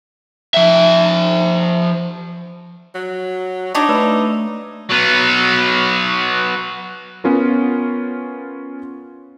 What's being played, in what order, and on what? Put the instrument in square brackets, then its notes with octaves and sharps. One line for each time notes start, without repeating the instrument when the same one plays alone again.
[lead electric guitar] F3 E5
[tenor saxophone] F#3
[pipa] D4 C#5 [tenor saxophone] D#4 [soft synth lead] C#6
[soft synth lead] A3 [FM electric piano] B4 D5 E6
[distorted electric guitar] F#3 B3
[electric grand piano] B3 C#4 F4 A#4